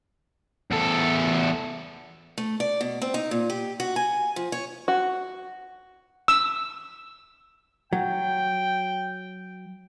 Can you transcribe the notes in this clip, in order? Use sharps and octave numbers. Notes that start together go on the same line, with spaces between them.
E2 A4
A3
D5
B2
C4
D#4
A#2
G4
F#4
G#5
F3
C#5
F#4
E6
F#3 G5